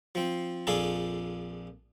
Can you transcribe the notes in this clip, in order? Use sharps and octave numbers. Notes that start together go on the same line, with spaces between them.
F3 C4
A#1 F2 D4 G#4 A4 F5